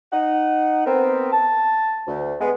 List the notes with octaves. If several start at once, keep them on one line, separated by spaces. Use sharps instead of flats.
D#4 F#5
B3 C4 A#4
A5
D2
G#3 B3